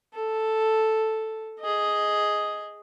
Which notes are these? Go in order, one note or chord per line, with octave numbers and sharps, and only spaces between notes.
A4
G#4 D#5